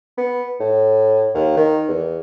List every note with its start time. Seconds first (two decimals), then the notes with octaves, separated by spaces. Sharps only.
0.18 B3
0.60 A2
1.34 D#2
1.57 D#3
1.88 E2